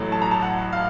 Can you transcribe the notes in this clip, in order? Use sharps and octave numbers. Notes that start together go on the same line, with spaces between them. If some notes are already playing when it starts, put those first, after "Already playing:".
Already playing: A1 A2 F#3 A3
A5
A#5
A5
F#5
F5